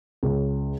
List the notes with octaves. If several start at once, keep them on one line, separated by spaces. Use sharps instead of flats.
C#2